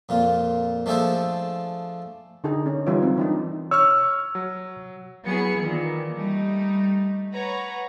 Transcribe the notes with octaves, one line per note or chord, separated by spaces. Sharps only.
F2 A#2 F4
F3 A3 D4 G#4 A4 C5
D3 D#4 G#4
C#4
E3 G3 D#4 F4 C#5
F#3 C4
E3 D4 D#4
C#5 C#6 E6 F6
F#3
F#3 B3 E4 G#4 C#7
A#2 D#3 E3
G3 A3 D#4
B4 C#5 F#5 A#5